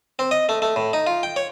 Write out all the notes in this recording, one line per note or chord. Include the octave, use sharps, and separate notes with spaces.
C4
D#5
A3
A3
A2
D#4
F4
G5
C#5